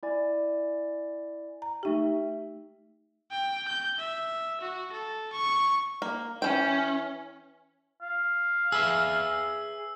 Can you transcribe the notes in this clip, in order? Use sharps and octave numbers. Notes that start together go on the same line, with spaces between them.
E4 D5 G#5
A#5
A3 D#4 G4 E5 G5
G5
G6
E5
F#4
A4
C#6
A#3
E3 C#4 G5
F5
G#4 B4 E5 E6